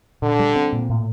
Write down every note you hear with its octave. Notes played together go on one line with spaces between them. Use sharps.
A#2 D3
G3
C4
A#2
A2